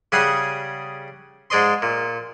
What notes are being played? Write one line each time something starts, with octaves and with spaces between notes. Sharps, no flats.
C#3 G3 G#4 F#5 G#5 D#6
G#2 G#3 D5 D#5 C6
A#2